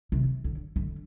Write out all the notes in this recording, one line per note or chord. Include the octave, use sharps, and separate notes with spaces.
C3
D3
D3